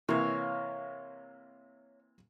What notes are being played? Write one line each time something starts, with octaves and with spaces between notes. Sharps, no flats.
C3 E3 A#3 C#5 F5